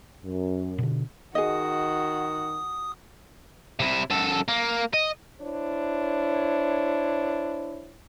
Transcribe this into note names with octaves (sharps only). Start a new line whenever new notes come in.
F#2
B2 D3
D#3 F#4 G#4 D#5 D#6
C3 E4
F#2 A4
A#3
D#5
D4 E4 C5 C#5